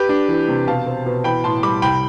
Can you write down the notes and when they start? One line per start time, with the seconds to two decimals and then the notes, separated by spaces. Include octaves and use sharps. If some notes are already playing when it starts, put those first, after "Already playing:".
Already playing: G4 B4
0.09 D4
0.28 E3
0.48 C3
0.67 B2 F5 A5
0.86 C4
1.06 B2
1.24 E3 G5 B5
1.44 A2 A5 C6
1.63 G3 B5 D6
1.82 C2 G5 B5